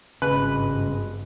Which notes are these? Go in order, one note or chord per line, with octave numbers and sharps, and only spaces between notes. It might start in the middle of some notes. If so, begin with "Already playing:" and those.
G#1 G2 C#3 G#3 B4